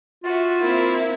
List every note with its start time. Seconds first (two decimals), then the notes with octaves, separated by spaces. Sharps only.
0.24 F4 F#4 E5
0.61 A#3 C4 E4 E5